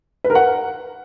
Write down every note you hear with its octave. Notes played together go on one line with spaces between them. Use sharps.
B4
A#4
F#5